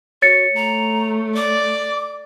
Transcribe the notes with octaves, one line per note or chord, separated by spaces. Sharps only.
F#4 C#5 A6 C#7
A3 A#5
D5 D6